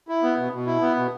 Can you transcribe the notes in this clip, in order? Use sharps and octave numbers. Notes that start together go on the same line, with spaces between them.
E4
B3
B2
B2
E4
B3
B2